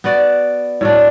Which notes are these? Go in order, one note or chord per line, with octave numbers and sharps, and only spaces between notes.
B3 F#4 D5
A2 F#3 D4